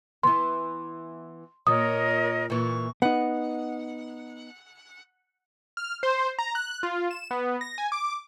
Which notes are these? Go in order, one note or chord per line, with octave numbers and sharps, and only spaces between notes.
E3 B3 C6
A#2 A#4 C#5 D#5 D#6
A#2 E3 C#6
B3 D#4 F#5
F6
C5
A#5
F#6
F4
E7
B3
A#6
G#5
D6